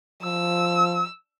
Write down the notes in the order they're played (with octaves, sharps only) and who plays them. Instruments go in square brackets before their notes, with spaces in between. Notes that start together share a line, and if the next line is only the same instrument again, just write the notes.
[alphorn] F3 [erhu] E6